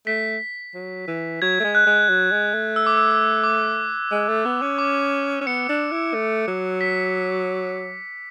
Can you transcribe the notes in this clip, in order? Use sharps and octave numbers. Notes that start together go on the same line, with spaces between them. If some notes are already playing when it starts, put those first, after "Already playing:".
A3 B6
F#3
E3
F#3 G#6
A3
G#3
F#6
G#3
F#3
G#3
A3
E6
D6
E6
E6
D6
G#3
A3
B3
C#4
D6
C#4
B3 C#7
D4
E4
A3
F#3
B6